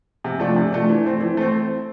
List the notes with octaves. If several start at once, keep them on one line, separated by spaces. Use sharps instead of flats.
C3
F3 A3 D4
C3
F3 A3 D4
E3
A3 C4
E3
A3 C4